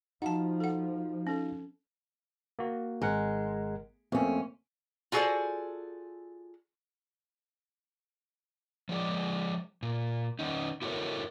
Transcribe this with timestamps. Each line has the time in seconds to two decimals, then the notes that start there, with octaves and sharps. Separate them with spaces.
0.22 F3 D#4 F#4 F5 F#5 A5
0.60 A4 F#5
1.27 C#4 A4
2.59 A#3 F#4
3.02 G#1 G#3 A#4 F#5
4.12 F2 A3 A#3 C4 C#4
5.12 F4 F#4 G#4 A4 C5 D5
8.89 F3 G#3 D5
9.82 A#2
10.39 D#3 C#4 D#4
10.82 E4 F#4 A4 A#4 C#5